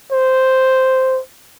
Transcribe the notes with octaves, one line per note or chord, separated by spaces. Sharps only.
C5